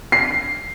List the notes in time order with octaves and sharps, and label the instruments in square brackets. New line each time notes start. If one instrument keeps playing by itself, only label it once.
[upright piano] C7